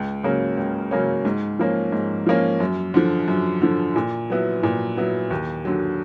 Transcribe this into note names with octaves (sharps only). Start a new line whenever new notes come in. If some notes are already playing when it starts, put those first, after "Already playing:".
Already playing: C#2
C#3 F#3 A#3 C#4
C#2
C#3 F#3 A#3 C#4
G#2
F3 A#3 C#4
G#2
F3 A#3 C#4
F#2
D3 F3
F#2
D3 F3
A#2
F#3 B3 E4
A#2
F#3 B3 E4
D#2
D3 F#3